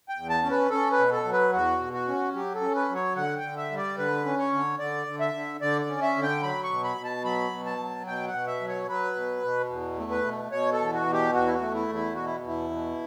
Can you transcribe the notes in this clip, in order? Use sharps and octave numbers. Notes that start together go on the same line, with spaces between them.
G5
E2
A5
C#4
B4
C#4 A4
B4
B2
A4
F#3
B4
E2 F#4
B2
F#4
C#4
F#3 G4
A4
C#4
B4
F#3
C#5
D3 F#5
G5
D3
E5
G3
D5
D3 B4
C#4
C#5
D3
D3 D5
D3
E5
D3
D3 D5
D5
C#4
E5
D3
G5
F#3 B5
C#6
B2
B5
B2
A5
F#3 B5
B2
A5
F#3
B2 G5
F#5
B2
E5
F#3
C#5
F#3 B4
B2
B2
E2
A3
B4
B2
B2 C#5
A4
E2
F#4
B2
G4
E2 F#4
E4
F#4
A3
E4
E2
E4
B2 F#4
E4
E2 E4
B2